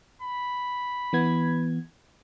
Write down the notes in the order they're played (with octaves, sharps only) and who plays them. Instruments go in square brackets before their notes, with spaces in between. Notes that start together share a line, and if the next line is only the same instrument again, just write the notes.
[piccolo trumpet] B5
[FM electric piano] E3 B3 G#6